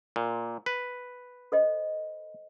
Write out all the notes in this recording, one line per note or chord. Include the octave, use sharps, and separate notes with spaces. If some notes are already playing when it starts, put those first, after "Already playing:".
A#2
B4
A4 C5 D#5